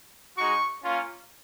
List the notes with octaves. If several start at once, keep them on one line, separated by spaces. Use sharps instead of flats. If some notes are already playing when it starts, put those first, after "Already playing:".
G#3 D#4 F#4 C#6
A#3 C#4 F4